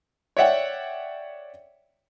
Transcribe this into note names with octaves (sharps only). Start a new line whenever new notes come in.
C#5 D5 E5 F#5 G5